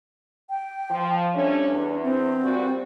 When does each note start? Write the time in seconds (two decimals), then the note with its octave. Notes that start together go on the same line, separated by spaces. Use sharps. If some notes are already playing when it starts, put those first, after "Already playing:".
0.50 G5
0.90 F3
1.34 G3 A3 C#4 D4
1.69 E2
2.03 C4
2.42 A#2 G3 F#4